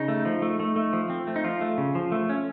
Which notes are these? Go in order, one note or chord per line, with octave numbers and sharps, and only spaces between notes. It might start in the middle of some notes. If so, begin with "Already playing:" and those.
Already playing: C#3 D#4
A3
F3
A3
A3
A3
F3
C4
A3
D#4
F3 F4
A3
C#3
F3
A3
C#4